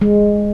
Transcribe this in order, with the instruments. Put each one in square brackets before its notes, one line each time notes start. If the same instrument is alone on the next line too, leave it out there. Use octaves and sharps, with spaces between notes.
[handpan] G#3